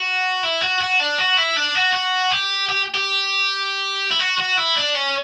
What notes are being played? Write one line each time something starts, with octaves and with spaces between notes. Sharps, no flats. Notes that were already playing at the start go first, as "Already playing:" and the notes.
Already playing: F#4
E4
F#4
F#4
D4
F#4
E4
D4
F#4
F#4
G4
G4
G4
E4
F#4
F#4
E4
D4
C#4